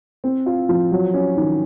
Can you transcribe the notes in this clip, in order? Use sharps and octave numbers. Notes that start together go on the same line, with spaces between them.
C4
F4
F3
F#3
C#4
D#3